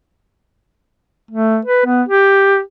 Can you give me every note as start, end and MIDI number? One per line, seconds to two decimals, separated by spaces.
1.31 1.59 57
1.65 1.85 71
1.86 2.02 59
2.08 2.60 67